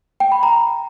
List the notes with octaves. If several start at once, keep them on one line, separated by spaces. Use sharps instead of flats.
G5
B5
A#5